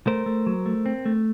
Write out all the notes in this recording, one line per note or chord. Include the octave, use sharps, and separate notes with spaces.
A3 A#4 C5
A3
F#3
A3
C4
A3